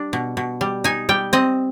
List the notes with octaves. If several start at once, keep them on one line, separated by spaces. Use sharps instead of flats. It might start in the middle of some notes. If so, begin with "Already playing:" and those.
Already playing: G3 D4
B2
B2
G3
D#4 G#5
G3 G5
C4 D#5